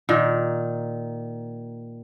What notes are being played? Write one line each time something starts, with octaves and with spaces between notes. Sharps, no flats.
A#2 D#3